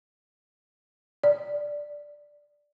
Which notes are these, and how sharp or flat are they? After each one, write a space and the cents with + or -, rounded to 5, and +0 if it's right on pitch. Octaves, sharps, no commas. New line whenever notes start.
D5 +0